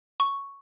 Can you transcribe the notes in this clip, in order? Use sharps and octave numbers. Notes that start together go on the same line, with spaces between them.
C#6